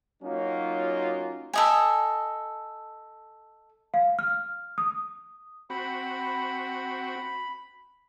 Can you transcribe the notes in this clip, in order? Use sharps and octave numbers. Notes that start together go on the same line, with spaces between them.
F#3 A#3 C#4 D#4 F4 F#4
A4 D#5 G#5
F5
F6
D#6
C4 F#4 B5